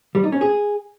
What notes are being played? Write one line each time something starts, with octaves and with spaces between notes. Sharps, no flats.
G3
D#4
C#4
G#4